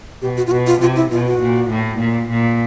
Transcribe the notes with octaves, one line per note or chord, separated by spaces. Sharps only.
B2 G4
F#4
F4
B2 F#4
F4
C3 F4
E4
B2 F4
F#4
A#2
A2
A#2
A#2